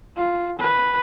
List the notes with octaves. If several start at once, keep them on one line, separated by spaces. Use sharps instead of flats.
F4
B4